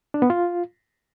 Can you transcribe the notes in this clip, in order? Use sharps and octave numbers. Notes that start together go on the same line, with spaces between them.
D4
B3
F4